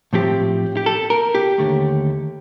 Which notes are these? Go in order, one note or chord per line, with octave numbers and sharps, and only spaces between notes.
A2 F3 C4 G4
G4
A4
A#4
G4
D#2 D3 A3